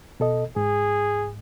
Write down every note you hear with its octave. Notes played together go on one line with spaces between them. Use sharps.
B2 A4 D#5
G#2 G#4